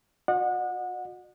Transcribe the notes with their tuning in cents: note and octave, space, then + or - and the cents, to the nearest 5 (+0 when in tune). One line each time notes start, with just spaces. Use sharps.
F#4 -40 D#5 -45 F#5 -25